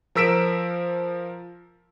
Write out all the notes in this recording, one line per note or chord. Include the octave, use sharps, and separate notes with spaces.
F3 A#4 E6 B6 D7 E7